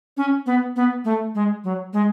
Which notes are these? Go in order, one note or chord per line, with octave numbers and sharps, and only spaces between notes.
C#4
B3
B3
A3
G#3
F#3
G#3